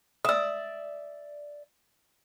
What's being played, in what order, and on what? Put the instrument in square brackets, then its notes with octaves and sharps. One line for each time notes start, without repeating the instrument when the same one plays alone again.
[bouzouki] D5 E5 [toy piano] D#6 E6